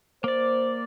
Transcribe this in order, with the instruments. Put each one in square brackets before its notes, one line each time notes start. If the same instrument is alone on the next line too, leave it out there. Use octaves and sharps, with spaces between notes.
[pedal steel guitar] A#3 D5 [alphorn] C5